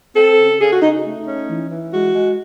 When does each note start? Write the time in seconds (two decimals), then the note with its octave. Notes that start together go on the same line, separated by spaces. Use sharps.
0.15 C4 A4
0.38 C#3
0.60 C#3 G#4
0.71 F#4
0.82 C#3 D#4
0.93 D#4
1.04 A3
1.26 C#4
1.49 E3
1.71 E3
1.93 G#3 F#4
2.15 G#3